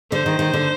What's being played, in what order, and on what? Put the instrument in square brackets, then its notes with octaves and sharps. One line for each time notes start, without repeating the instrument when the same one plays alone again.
[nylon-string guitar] D3 [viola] C5
[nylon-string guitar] D#3
D#3
D3